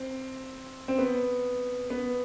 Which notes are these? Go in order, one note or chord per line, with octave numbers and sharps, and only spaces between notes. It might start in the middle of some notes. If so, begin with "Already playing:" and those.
Already playing: C4
C4
B3
B3